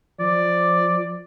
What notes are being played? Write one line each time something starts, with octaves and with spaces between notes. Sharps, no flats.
F3 D5